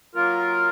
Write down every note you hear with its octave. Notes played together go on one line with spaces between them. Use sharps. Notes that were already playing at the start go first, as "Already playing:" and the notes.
F#3 A#3 F4 A#4